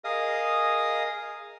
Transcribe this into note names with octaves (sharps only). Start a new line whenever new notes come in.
G#4 A#4 D#5 F5 D#6